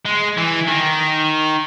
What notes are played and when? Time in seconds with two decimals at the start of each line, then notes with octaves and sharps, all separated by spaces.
0.05 G#3
0.37 E3
0.68 D#3